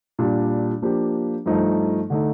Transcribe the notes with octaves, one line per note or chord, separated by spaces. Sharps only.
A#2 G3 D4
F3 A#3 D4 G4
G2 F3 A3 D#4
D3 A3 D#4